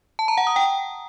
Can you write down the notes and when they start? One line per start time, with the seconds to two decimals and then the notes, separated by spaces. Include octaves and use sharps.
0.19 A5
0.28 A#5
0.37 F#5
0.47 D#6
0.56 G5